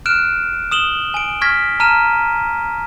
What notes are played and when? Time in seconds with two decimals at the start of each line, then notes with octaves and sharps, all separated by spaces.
0.06 F6 F#6 D7 E7
0.72 D#6 E7 F#7 G7
1.14 G#5 D7
1.41 C#6 F6 G#6 A#6 B6
1.80 A5 A#5 F6 D#7 E7